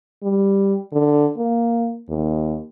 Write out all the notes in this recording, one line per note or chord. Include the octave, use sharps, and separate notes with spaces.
G3
D3
A#3
D#2